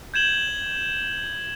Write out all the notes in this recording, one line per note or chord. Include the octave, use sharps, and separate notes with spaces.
G6 G#6 E7 F#7 G7